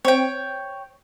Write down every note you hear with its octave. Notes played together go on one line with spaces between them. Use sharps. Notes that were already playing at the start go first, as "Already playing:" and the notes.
C4 C#5 G5